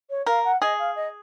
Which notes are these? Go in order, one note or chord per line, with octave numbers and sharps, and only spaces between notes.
C#5
A#4 F5
F#5
G#4 D#5
F5
D#5